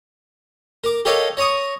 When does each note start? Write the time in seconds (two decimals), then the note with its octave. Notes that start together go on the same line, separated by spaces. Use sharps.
0.84 A#4 D6
1.05 G4 A4 A#4 C#5 D#5 F5
1.37 C#5 A#5 C#6 D#6